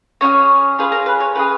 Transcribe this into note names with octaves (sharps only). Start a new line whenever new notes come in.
C#4 F4 G#4 C#5
C#4 F4 G#4 B4
A#4
B4
C#5
C#4 F4 G#4 B4